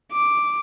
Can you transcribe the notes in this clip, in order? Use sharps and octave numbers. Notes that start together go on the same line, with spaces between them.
D6